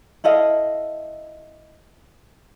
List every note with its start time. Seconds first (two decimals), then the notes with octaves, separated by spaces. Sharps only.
0.24 E4 A4 D#5 F5